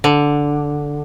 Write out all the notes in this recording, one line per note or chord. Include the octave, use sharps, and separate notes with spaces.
D3